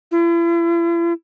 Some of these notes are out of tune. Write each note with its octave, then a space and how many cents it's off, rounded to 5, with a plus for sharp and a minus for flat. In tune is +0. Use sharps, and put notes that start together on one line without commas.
E4 +45